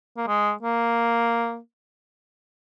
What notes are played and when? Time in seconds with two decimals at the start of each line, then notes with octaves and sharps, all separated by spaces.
0.17 A#3
0.28 G#3
0.63 A#3